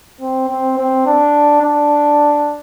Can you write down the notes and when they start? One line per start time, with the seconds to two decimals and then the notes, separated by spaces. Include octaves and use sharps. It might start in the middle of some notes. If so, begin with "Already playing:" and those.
0.21 C4
0.49 C4
0.78 C4
1.06 D4
1.62 D4